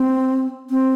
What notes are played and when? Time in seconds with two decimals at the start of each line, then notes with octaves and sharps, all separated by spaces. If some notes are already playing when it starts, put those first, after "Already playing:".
Already playing: C4
0.70 C4